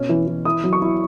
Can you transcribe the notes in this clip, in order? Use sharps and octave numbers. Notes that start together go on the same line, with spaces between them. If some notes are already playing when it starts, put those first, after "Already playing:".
Already playing: B2 C#4
E3
E3
E4 D#6
F#3
C#6
E4